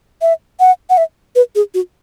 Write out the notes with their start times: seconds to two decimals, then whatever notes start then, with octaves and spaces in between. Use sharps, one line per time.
0.22 E5
0.60 F#5
0.90 F#5
0.97 E5
1.35 B4
1.55 G#4
1.74 F#4